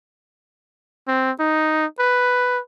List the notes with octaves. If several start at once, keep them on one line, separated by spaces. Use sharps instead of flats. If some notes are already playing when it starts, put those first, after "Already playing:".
C4
D#4
B4